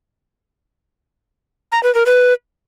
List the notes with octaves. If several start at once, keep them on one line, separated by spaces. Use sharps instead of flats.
A#5
B4
A#4
B4